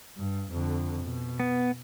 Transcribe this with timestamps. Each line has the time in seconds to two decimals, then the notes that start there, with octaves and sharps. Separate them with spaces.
0.18 G2
0.52 F2 D3
1.03 B2
1.40 B3